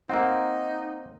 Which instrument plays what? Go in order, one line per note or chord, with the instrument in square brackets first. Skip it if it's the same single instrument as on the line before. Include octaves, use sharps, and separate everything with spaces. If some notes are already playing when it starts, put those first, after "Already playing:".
[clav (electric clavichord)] A#3 C4 [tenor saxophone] D#4 [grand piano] F#5